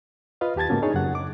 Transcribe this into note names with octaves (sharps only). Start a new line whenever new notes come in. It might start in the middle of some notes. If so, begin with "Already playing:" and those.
F4 B4 D#5 F5
D#2 G4 A5 G#6 A6
G#2 C#3 A#3 B3 C#4 F#4
D4 D#4 G#4 C#5
F#2 C#3 F#5
D6